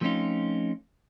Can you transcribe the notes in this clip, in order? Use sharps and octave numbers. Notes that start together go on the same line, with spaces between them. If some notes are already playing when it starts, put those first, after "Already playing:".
F3 A3 C4 C#4 D#4 F4